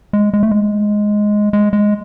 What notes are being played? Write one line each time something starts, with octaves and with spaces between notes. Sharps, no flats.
G#3
G#3
A3
G#3
G#3
G#3